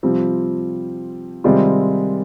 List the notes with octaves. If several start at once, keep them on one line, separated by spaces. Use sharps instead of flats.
C3 F3 G3 C4 F4
C3 D#3 G3 G#3 C4 F4